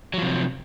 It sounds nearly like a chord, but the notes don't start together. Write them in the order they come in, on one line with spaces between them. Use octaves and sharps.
F#3 F3 C3